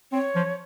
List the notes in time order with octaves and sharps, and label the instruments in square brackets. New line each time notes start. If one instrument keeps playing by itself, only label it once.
[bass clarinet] C4 [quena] C#5
[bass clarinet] F3